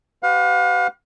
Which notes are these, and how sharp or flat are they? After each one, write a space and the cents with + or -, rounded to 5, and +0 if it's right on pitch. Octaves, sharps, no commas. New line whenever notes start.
G4 -35 B4 +35 F5 +40